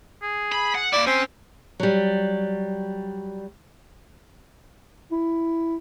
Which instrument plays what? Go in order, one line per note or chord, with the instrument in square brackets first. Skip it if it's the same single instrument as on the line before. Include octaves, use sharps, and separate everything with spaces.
[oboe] G#4
[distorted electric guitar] B5
F#5
[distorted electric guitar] A#3 E4 [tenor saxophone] D5
[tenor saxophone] C4 [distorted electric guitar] C#4 [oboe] C6
[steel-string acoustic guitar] F#3 G3
[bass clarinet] E4